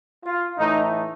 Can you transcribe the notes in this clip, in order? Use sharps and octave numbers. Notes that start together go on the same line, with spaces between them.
F4
A2 E3 A3 D#4